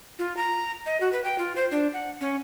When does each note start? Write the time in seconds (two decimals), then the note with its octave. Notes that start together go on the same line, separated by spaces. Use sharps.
0.19 F4
0.37 A#5
0.86 D#5
1.01 F#4
1.13 B4
1.25 G5
1.38 F4
1.56 C5
1.71 D4
1.93 F#5
2.21 C#4